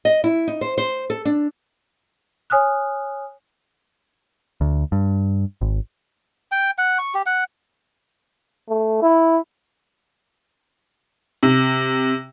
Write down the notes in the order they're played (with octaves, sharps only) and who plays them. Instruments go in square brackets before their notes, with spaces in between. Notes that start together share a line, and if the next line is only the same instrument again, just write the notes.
[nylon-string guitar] D#5
E4
D#4
C5
C5
A4
D4
[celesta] C#5 G#5 D#6 F6 F#6
[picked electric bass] D2
G2
G#1
[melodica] G5
F#5
C#6
G4
F#5
[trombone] A3
E4
[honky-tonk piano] C3